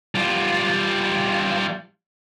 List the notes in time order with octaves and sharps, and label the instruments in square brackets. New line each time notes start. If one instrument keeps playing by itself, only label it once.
[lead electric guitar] G3 F4